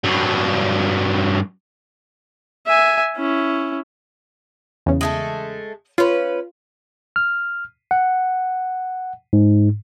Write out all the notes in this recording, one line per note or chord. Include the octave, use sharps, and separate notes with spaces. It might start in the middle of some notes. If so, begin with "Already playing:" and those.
G2 F#3
E5 G#5
C#4 E4
E2 C#3
G#3 A3 A4
C#4 F4 B4
F6
F#5
G#2